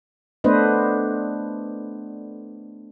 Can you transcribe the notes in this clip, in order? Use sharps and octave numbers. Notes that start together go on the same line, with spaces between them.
A3 B3 D4 B4 C5 D#5